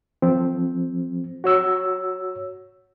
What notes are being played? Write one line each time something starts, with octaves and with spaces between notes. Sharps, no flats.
F3 C4
F#4 C#5 E6